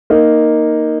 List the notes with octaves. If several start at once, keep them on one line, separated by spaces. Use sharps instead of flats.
A#3 D#4